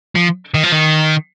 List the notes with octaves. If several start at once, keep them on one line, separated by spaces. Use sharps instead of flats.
F3
D#3
F3
D#3